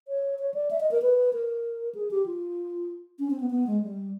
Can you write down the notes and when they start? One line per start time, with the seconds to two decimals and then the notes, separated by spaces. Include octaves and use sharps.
0.08 C#5
0.39 C#5
0.54 D5
0.71 E5
0.80 D#5
0.91 A#4
1.02 B4
1.33 A#4
1.95 G#4
2.11 G4
2.26 F4
3.19 C#4
3.30 C4
3.40 B3
3.50 B3
3.67 G#3
3.82 G3